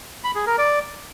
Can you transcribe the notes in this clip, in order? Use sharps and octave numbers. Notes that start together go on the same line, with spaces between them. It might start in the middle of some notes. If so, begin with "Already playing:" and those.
B5
G#4
A#4
D5